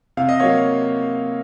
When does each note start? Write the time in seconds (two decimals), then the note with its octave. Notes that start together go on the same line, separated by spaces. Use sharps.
0.17 C3 F5
0.29 D#5
0.40 F#3 A#3 C#5 F5